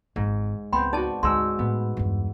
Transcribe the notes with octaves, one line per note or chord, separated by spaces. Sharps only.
G#1 G#2
C#2 B3 C4 G5 B5 C6
D#4 F#4 D5 A5
D2 G#2 G#5 C6 E6
A2 A3 B3
E2 G2